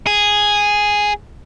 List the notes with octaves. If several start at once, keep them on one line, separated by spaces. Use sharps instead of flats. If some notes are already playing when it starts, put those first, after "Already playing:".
G#4